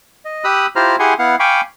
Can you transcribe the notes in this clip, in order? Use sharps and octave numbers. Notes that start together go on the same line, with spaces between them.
D#5
G4 B5 D#6 E6 F#6
E4 F4 G4 C5 A#5 F6
E4 G4 G#4 F#5 G#5 C6
B3 E4 F5 F#5
F5 G5 G#5 B5 C#6 D6